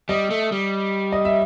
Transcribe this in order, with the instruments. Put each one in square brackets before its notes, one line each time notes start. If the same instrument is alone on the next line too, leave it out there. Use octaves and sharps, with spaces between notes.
[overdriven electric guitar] G3 [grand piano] D#5
[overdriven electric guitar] A3
G3
[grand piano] D#5
E5